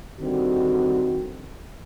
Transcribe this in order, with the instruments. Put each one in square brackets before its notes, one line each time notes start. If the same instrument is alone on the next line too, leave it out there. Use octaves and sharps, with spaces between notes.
[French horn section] D3 D#3 G3 C4 F#4